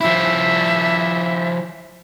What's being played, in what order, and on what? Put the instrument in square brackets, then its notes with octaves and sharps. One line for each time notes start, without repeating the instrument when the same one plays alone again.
[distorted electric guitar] F3 E4 [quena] E5